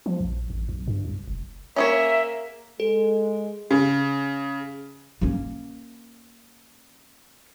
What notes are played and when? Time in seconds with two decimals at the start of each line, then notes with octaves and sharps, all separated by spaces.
0.06 F3
0.20 A#1
0.50 A1
0.69 B1
0.87 G2
1.05 C2
1.28 F1
1.76 A#3 C#4 G#4 C#5 E5
2.80 G#3 A4
3.71 C#3
5.21 A#3 C#4